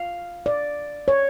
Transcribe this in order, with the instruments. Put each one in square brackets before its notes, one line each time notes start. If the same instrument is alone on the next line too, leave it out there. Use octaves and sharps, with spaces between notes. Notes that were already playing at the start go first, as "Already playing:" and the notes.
Already playing: [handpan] F5
D5
C#5